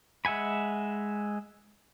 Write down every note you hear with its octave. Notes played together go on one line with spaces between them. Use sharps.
G#3 E5 F#5 G#5 B5